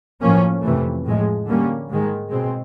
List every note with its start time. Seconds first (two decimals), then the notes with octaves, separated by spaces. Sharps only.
0.22 A2 F3 A#3 C#4
0.63 F2 C3 E3 A3
1.05 A2 F3 G#3
1.47 D3 G3 A#3 C#4
1.89 G#2 D#3 G#3
2.31 B2 G#3 C4